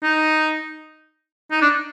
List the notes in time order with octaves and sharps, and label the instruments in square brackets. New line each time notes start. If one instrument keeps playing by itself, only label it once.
[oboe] D#4
D#4
D4